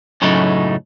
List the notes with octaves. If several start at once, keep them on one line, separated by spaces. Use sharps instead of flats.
F#2 A2 C#3 F#3 A3 D#4